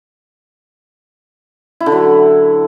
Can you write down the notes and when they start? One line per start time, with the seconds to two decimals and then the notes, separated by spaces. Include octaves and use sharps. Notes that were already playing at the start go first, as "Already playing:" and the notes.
1.80 E4
1.86 D3
1.92 F#3